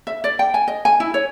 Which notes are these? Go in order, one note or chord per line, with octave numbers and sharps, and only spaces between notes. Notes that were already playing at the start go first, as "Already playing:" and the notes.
E5
D5
G5
G#5
D#5
G#5
E4
C#5